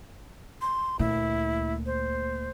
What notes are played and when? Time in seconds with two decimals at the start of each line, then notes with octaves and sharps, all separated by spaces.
0.61 C6
0.99 D2 A#2 E4
1.86 C5